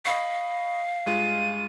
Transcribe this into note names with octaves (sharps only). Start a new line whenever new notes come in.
D#5 F5 B5 C#6
G2 G#3 F4 D#7